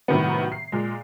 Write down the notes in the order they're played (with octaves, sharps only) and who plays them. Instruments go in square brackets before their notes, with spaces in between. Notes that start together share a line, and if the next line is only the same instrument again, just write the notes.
[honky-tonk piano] A2 C3 D#3 F#3 G3 B3
C7
A#2 G#3